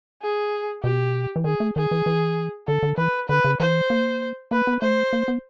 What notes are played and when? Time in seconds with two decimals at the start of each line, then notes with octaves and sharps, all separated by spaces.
0.22 G#4
0.84 B2 G4
1.36 E3
1.44 D#3 G#4
1.60 A3
1.76 D#3 G#4
1.91 E3
2.06 E3
2.67 D3 A4
2.83 D3
2.98 E3 B4
3.29 D3 B4
3.44 C#3
3.60 E3 C5
3.90 A#3
4.51 A#3 B4
4.67 B3
4.82 A3 C5
5.13 A#3
5.28 B3